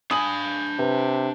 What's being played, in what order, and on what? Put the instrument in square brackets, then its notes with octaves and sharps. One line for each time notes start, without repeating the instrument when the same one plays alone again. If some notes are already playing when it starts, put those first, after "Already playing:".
[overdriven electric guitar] D4 B5 [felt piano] G#5 D#6
[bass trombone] C3 [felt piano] B4